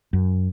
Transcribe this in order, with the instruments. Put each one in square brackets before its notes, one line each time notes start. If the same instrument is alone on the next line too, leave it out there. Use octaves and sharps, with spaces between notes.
[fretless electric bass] F#2